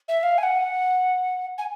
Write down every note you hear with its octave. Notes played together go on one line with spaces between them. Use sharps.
E5
F5
G#5
F#5
G#5